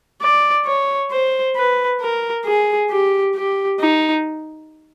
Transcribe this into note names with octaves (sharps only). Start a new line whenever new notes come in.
D5
C#5
C5
B4
A#4
G#4
G4
G4
D#4